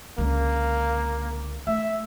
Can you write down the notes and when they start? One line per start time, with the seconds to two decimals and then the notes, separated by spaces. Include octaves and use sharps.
0.18 C#2 D3 A#3
1.67 A3 E5